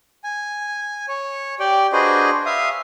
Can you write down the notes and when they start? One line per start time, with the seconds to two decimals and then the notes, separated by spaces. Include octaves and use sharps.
0.24 G#5
1.08 C#5
1.60 G4 D5 G5
1.93 D4 F#4 G#4 B4 C5 D#5
2.46 E5 F5 D#6